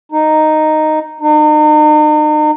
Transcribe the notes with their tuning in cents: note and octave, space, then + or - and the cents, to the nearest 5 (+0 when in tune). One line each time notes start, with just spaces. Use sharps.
D#4 -5
D#4 -40